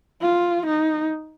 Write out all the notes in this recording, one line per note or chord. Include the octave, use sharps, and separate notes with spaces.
F4
D#4